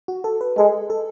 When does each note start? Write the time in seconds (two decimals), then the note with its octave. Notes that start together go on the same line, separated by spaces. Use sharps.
0.08 F#4
0.24 A4
0.41 B4
0.57 G#3 A4
0.90 A4